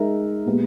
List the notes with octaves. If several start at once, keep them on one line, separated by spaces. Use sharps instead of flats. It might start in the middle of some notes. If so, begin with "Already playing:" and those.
Already playing: G#3 D#4 A#4 E5
A#2 G#3 B3 G4